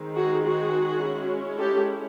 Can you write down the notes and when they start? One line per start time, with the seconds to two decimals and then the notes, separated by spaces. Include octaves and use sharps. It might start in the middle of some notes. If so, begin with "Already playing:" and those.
Already playing: D#3 G#3 C4 D#4
0.15 F#4 G#4
0.44 F#4 G#4
1.02 G#3 C#4 E4
1.59 G4 A4